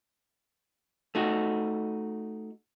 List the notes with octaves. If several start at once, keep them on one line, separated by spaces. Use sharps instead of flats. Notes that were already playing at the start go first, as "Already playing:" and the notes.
A3 D#4 F#4